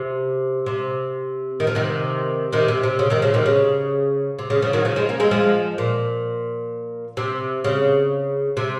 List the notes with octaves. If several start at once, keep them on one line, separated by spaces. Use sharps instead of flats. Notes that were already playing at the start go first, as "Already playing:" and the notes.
Already playing: C3
C3
D#3
F3
C3 D#3
C3 D#3
C3
C3
C#3
C3 D#3
C#3 F3
C3 D#3
C#3
C3
C#3
C#3 F3
D#3 F#3
C#3 F3
F3 G#3
A#3 C#4
G#3 C4
F3 G#3
A#2
C3
C#3
C3